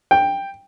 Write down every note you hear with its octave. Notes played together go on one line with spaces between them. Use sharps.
G5